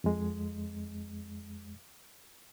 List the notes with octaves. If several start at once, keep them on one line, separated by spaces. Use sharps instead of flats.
F2 G#3